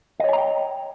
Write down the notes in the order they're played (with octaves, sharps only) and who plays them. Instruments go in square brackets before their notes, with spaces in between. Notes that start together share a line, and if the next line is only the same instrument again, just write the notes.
[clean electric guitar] D#5
C#5
G#5
A#5
G5